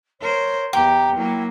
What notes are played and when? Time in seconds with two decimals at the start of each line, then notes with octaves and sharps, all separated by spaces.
0.21 A#4 C5 C#5
0.73 E2 G4 G5 A#5
1.15 F#3 A#3 E4